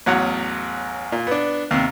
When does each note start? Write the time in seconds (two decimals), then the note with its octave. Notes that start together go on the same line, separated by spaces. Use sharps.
0.06 A1 E2 F#3 F#5
1.12 A#2
1.27 B3 D4
1.71 D#2 C3